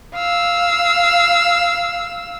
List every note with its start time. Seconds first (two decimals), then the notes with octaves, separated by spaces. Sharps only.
0.14 F5 E6